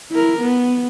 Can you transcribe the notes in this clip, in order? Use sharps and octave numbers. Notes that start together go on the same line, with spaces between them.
E4 A#4
B3